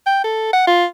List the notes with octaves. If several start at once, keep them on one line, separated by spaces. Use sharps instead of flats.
G5
A4
F#5
F4